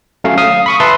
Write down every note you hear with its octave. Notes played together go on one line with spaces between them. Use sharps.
F#3 A3 C#4 F5
F5 D#6 F6
B5 C#6 D#6
B4 E5 A5 C6